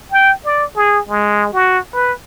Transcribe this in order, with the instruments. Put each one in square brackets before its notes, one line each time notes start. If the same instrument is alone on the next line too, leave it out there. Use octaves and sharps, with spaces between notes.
[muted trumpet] G5
D5
G#4
G#3
F#4
B4